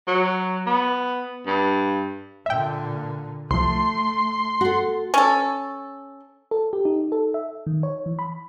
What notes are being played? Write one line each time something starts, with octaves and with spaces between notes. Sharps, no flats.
F#3
B3
G2
A#2 D3 E5 G5
C2 F3 A3 C6
F#4 A4
C#4 A4
A4
G4
D#4
A4
E5
D#3
C#5
E3
B5